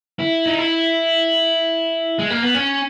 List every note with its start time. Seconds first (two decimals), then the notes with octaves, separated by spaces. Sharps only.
0.19 E4
0.46 D#4
0.58 E4
2.19 G#3
2.30 A#3
2.43 B3
2.55 C#4